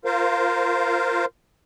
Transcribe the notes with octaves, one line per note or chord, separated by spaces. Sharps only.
F4 A#4 C5 F5